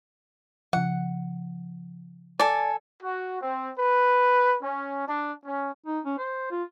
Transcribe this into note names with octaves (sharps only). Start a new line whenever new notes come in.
C#3 F3 F#5
A4 D5 G#5
F#4
C4
B4
C#4
D4
C#4
D#4
C#4
C5
F4